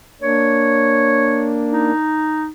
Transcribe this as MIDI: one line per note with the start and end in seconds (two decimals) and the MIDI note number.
0.22 1.92 58
0.22 1.92 62
0.22 1.61 73
1.72 2.49 63